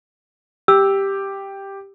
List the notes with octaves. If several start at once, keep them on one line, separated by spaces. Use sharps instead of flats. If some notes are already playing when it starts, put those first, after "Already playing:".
G4 E6